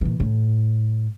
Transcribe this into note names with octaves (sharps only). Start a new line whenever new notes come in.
A#2 E3
A2